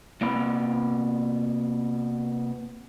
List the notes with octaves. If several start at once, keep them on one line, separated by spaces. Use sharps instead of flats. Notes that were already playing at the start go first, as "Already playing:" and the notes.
C3 A#3 B3 F5 B5